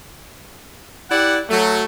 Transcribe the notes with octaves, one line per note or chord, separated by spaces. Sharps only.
E4 G4 D5 F#5
F#3 A3